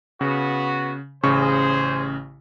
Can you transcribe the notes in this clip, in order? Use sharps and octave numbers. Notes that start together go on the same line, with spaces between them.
C#3 B3 F#4
A1 C#3 G#4 C5 C#6